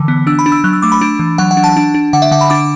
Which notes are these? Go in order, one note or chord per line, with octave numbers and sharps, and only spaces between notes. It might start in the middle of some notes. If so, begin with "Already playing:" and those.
Already playing: D3 E3
B3
D4 E6
B5
D4
E6
F#3 F#6
E6
A3 D6
B5
D4
E3
F#3 F#5
F#5
D4
A5
D4
D4
D3 F#5
E5
D3 F#5
B5
D4 D6